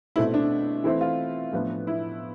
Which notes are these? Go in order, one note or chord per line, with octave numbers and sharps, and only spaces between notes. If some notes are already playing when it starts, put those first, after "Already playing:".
B2 A3 C4 E4
D4
E3 A3 C4 E4
F4
A2 F3 B3 D4
E4